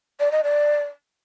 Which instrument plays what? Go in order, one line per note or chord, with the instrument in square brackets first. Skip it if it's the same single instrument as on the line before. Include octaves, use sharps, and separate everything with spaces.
[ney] D5
D#5
D5